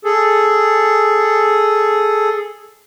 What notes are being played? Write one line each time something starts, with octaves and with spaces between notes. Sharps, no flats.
G#4 A4